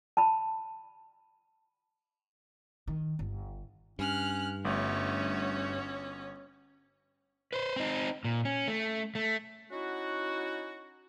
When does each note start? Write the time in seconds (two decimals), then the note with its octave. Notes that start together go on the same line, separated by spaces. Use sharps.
0.17 A5 B5
2.87 D#3
3.19 G1
3.99 G2 C#4 F6 F#6
4.65 G1 A3 C#4 F#4 C#5
7.53 B4 C5
7.76 C4 D#4
8.25 A#2
8.45 C#4
8.68 A3
9.15 A3
9.71 C#4 D#4 E4 F#4